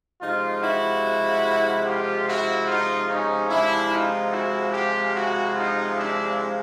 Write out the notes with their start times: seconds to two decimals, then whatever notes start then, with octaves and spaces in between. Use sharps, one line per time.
0.20 C3 F3 G#3 D#4 F4
0.62 E4 F#4
1.85 F4 G4
2.27 E4 F#4
2.67 D#4 F4
3.09 C#4 D#4
3.49 C3 F3 G#3 D4 E4
3.90 D#4 F4
4.32 E4 F#4
4.72 F4 G4
5.14 E4 F#4
5.55 D#4 F4
5.97 D4 E4